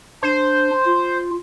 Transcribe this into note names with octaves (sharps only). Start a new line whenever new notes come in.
D4 C5
F4